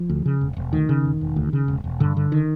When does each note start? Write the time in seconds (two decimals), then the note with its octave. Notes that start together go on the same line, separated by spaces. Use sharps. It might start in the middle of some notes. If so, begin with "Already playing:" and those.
Already playing: F3
0.09 D2
0.25 C#3
0.41 E1
0.57 E1
0.73 D2 D#3
0.89 C#3
1.05 E1
1.21 E1
1.36 D2
1.53 C#3
1.68 E1
1.84 E1
2.00 G2 D3
2.17 D3
2.32 D#3